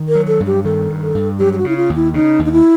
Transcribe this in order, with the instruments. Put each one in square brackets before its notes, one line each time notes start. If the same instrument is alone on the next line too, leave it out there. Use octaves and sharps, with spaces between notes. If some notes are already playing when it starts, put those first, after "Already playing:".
Already playing: [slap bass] D#3
[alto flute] A#4
[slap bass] F#3
[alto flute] A4
[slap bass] G2
[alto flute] G4
[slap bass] D#3 [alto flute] A4
[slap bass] G2
[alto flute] A4
[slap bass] G2
[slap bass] F#3 [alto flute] G4
[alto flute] G4
F#4
[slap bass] C#3 [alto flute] E4
[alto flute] F4
[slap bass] D#2
[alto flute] E4
[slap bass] C#3 [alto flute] D#4
[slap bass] D#2
[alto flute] D#4
E4